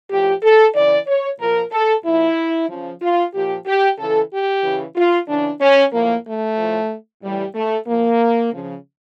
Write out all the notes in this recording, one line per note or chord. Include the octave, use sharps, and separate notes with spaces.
A2 F3 G4
A4
C#3 E3 D5
C#5
A#2 F3 A#4
A4
A#2 F3 E4
C#3 F3
F4
A#2 F3 G4
G4
C#3 E3 A4
G4
C#3 E3
F4
C#3 E3 D4
C#4
A2 F3 A#3
A3
A2 F3
A2 E3 G3
A3
A#2 F3 A#3
C#3 F3